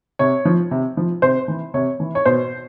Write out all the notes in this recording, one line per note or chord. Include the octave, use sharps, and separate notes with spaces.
C3 C#5
F3
C3
F3
C3 C5
E3
C3 C#5
E3
C#5
B2 C5